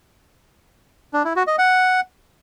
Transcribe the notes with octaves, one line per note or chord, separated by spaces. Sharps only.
D4
E4
F#4
D#5
F#5